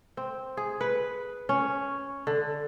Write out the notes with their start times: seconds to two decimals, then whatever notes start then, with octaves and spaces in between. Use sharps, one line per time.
0.17 C4
0.57 G#4
0.81 B4
1.49 C#4
2.27 D3